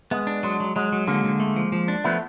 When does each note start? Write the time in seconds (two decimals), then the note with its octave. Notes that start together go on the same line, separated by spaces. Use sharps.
0.11 G#3 B3
0.27 D4
0.43 F#3 G#3
0.60 F#3
0.76 F#3 G#3
0.93 F#3
1.07 D3 G#3 A#3
1.24 D3
1.40 A3
1.56 F3
1.72 F3
1.88 D4
2.04 F3 A3 B3